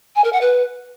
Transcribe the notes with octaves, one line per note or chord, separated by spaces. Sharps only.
G#5
A#4
F#5
B4